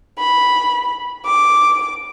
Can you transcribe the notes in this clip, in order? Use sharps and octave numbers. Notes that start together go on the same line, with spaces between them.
B5
D6